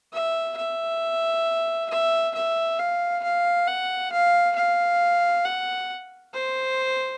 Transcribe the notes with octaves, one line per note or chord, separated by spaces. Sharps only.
E5
E5
E5
E5
F5
F5
F#5
F5
F5
F#5
C5